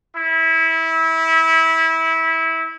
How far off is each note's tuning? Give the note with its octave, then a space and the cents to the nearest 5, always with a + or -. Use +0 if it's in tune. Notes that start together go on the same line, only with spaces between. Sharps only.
E4 -20